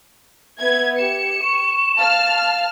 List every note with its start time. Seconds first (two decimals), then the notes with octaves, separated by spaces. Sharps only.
0.58 B3 E5 G#6
0.99 G4 C#7 E7
1.42 C#6
1.96 F5 A5 F6